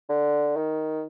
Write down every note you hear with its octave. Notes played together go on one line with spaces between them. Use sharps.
D3
D#3